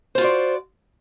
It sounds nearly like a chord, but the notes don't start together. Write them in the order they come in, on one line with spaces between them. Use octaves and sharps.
C5 F4 F#4 D5